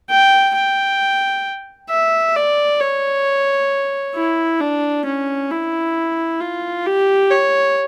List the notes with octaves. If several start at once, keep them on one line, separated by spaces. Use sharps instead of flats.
G5
G5
E5
D5
C#5
E4
D4
C#4
E4
F4
G4
C#5